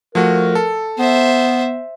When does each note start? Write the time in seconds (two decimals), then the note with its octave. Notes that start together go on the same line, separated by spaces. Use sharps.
0.15 F3 A3 F#4 A#4
0.55 A4
0.99 B3 C5 E5